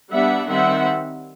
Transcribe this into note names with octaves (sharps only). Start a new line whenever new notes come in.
G3 B3 D4 E5 F#5
D#3 G3 C4 E5 F#5